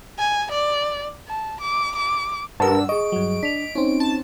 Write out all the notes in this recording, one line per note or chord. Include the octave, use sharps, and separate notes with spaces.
G#5
D5
A5
D6
D6
G2 A#4 B4 F#5 A5 E6
G#4 D#5 C#6 D7
G2 F#3
D4 B6 F7
C4 C#4 D#4
A5